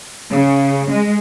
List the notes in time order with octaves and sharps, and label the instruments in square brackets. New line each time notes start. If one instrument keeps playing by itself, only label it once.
[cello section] C#3
G#3